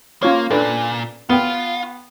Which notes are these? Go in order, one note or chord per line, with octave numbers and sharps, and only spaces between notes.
A#3 C#4 F4 C#5
A#2 D4 A4 B4 D5
B3 F4 G5